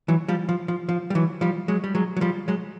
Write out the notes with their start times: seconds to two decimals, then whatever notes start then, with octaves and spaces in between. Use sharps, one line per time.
0.08 E3 F#3
0.28 F3 G3
0.49 F3
0.68 F3
0.89 F3
1.10 G3
1.15 E3 F#3
1.41 F3 G3
1.68 F#3 G#3
1.84 G3
1.95 F#3 G#3
2.17 F#3
2.21 F3 G3
2.48 F#3 G#3